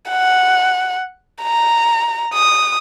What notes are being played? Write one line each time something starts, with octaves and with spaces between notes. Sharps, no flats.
F#5
A#5
D#6